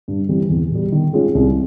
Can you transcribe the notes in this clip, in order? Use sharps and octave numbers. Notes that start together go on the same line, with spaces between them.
G2
E3 G3 C4
E2
B2 G3
D#3
G#3 C#4 F4 G#4
C2